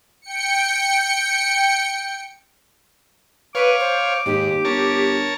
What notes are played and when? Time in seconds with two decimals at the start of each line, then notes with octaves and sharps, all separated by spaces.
0.22 G5 C#7
3.55 B4 C#5 F5 D6
3.80 C5
4.26 D#2 G#2 G4
4.65 G1 A#4 C#5 A5